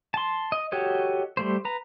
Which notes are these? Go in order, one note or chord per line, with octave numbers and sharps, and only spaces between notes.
A5 C6
D#5
F#4 G4 A4 C#5 D#5
G3 A3 C5
B4 A#5